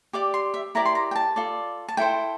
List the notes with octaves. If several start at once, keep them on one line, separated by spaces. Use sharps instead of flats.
G4 D5 D6
C6
E5
E4 G4 A#4 D5 A#5
C6
A#5
G5
A5
F4 A4 D5
A5
E4 A4 C5 G5